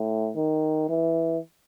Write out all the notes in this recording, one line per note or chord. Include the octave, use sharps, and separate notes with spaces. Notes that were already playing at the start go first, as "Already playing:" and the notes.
Already playing: A2
D#3
E3